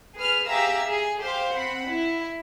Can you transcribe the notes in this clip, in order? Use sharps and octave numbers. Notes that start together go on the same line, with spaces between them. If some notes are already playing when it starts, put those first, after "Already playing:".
G#4 B4 F6
G4 G#4 E5 F5 A#5 E6
G#4
G4 C5 F5
C4 F#5 B5
E4